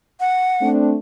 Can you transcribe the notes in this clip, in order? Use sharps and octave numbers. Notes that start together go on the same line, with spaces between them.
F#5
A3 C4 D4